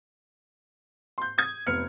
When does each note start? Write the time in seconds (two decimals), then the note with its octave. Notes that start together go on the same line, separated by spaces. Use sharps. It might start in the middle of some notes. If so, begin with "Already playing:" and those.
1.18 C6 G6
1.38 D#6 G#6
1.67 F1 B3 F6 C#7